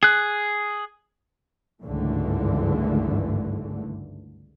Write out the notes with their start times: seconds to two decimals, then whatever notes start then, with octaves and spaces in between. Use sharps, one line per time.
0.03 G#4 F#6
1.82 G#1 C#2 G2 D3 E3 A3